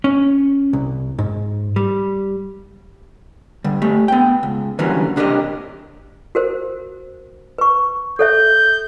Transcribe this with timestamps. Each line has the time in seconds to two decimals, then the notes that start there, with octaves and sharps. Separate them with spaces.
0.04 C#4
0.73 C2
1.19 G#2
1.76 G3
3.64 D3 G3
3.82 A3 G4
4.08 B3 G5
4.43 C#2
4.79 D3 E3 F#3 G3 A#3 C#4
5.16 C3 D4 G4 A#4 D#5
6.35 F#4 A#4 C5
7.58 B4 C#6
8.19 A4 C#5 E5 G6